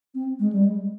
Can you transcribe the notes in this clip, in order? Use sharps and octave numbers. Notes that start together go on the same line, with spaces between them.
C4
G#3
G3
G#3